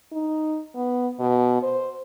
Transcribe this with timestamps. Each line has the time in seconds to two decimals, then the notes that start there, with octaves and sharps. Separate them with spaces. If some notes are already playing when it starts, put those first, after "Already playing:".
0.12 D#4
0.75 B3
1.20 B2
1.63 C5